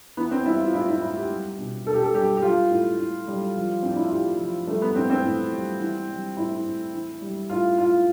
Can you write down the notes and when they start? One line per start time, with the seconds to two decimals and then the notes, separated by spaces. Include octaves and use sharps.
0.17 E3 B3
0.31 C4
0.45 G3 E4
0.60 F4
0.73 A2 E4
0.88 E4
1.02 A2 E4
1.16 G4
1.29 G3
1.58 B2
1.86 B2 A4
1.94 G4
2.02 A4
2.14 G3 G4
2.37 G4
2.42 G3 F4
2.71 A2
2.98 A2
3.27 G3
3.55 F3
3.82 A2 C4
3.90 D4
3.97 E4
4.04 F4
4.11 A2 G4
4.40 F3
4.67 G3 A3
4.82 B3
4.95 A2 C4
5.10 C4
5.25 A2
5.53 G3
5.80 E3
6.09 G3
6.37 A2 E4
6.65 A2
6.94 E3
7.21 G3
7.50 A2 F4
7.78 A2 F4